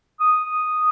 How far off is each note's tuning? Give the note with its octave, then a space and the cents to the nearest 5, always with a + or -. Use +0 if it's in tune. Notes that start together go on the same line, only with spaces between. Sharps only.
D#6 -5